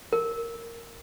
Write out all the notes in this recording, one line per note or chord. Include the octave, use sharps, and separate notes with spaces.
A#4